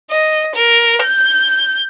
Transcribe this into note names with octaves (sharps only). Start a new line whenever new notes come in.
D#5
A#4
G6